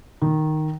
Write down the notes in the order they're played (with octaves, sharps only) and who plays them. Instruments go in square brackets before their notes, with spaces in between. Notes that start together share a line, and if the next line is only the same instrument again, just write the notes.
[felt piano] D#3